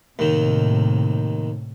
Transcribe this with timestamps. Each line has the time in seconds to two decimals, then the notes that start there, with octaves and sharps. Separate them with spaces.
0.19 D#2 A2 C3 D#3